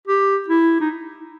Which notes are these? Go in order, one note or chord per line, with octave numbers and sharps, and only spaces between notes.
G4
E4
D#4